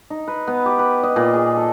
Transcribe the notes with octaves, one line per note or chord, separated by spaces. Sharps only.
D#4
B4
B3
G4
B4
D#5
A#2
G#4
A4